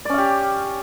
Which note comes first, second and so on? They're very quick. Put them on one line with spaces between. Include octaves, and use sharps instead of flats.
D5 C#4 F5 G4